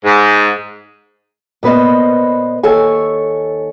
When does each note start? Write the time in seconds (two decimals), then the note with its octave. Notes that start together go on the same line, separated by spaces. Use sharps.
0.04 G#2
1.63 A#2 B3 B4 C5 D#5
2.63 D#2 A4 C#5 G#5